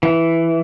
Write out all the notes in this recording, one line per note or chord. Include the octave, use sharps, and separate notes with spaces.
E3